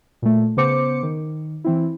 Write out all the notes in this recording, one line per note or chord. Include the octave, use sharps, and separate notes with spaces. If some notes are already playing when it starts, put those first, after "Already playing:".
A#2 A3
C#3 B3 C5 D6 C#7
D#3
E3 C4 E4